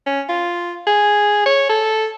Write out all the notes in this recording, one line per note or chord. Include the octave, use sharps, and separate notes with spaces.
C#4
F4
G#4
C#5
A4